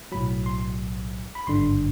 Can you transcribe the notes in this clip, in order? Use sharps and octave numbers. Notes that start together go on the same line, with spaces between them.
B1 A2 F#3 B5
C6
B5
G#1 G2 D3 C6